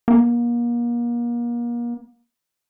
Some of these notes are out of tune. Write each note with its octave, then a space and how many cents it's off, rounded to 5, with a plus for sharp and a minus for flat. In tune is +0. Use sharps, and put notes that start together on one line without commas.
A#3 +35